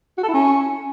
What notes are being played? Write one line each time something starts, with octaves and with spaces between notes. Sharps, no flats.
F#4
A4
E4
C#4